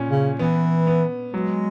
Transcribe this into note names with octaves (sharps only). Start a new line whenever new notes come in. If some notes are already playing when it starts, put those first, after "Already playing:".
Already playing: A#2 C#4
C#3
E3 B3
B3
F#3 G#3